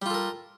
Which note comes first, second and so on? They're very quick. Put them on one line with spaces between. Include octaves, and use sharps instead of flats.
G3 F4 A4 A#4